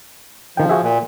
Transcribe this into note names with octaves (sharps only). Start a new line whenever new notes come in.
D#3 F3 G5
F#4 G#4 E5
A#2